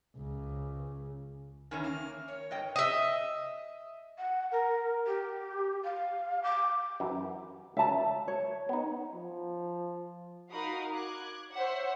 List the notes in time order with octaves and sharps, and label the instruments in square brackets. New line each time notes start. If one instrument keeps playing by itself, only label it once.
[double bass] C#2
[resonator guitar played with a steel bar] D#3 E3 C#4 [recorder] G#5
[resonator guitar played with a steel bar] A#3 [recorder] F6
[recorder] C#5
[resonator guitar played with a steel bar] G2 D#5 G5
[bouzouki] D#5 E5
[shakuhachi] F#5
A#4
G4
F5
D6
[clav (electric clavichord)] F#2 E3
[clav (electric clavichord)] C#2 A#5 [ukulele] E5 A5
[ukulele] C#5
[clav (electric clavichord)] B3 D#4
[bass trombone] F3
[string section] D#4 F#4 A#4 F5 B5 D#6
D6 F#6 G#6
C5 C#5 E5 F#5